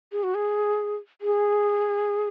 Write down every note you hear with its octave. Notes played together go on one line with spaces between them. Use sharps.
G#4
F#4
G#4
G#4